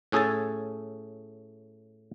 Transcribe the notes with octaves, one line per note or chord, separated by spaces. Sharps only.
A2 C#4 G#4 A4 G#5 A5